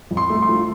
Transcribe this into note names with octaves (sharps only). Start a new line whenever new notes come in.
F2
C6
A3
C6
F3